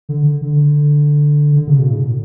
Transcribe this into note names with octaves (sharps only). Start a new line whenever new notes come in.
D3
D3
D3
C#3
B2
A2